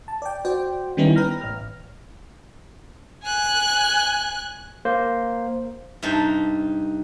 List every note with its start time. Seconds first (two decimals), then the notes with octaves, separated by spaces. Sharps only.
0.08 A5
0.22 D5 G5
0.45 F#4 C5 D5 G5
0.97 D#3 G3 B3 C#4 D#4 E4
1.16 B4 G5 A#5 F6 A#6
1.41 A1 F6
3.24 G#5 F#6
4.85 A#3 C5
6.03 G2 C3 D#4 A5